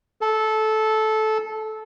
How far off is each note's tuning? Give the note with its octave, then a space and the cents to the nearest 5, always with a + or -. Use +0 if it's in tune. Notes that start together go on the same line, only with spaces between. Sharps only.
A4 -15